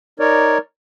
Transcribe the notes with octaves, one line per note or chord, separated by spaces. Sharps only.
D#4 A#4 C#5 D5